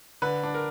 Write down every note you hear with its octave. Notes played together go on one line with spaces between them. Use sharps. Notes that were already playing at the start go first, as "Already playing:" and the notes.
D3 B4
D4
A#4